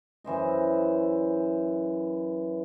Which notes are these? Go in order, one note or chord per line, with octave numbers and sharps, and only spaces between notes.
F#2 E3 C5 D#5